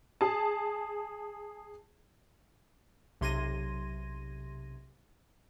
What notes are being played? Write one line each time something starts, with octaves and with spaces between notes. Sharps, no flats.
G#4 A5
B1 C3 C6 G#6 A#6 D#7